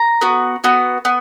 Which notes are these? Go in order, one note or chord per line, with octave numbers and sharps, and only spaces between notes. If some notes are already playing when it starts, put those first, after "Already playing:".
Already playing: A#5
B3 F#4
B3 F#4
B3